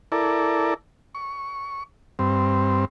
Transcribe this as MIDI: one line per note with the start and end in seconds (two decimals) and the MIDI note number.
0.12 0.74 64
0.12 0.74 69
0.12 0.74 70
0.12 0.74 74
1.15 1.83 85
2.19 2.85 43
2.19 2.85 60